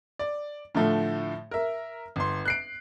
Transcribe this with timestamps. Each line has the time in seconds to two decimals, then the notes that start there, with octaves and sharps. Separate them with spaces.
0.19 D5
0.75 A2 D3 F3 A3
1.51 A#4 E5
2.16 G1 C6
2.46 F#6 C7 D7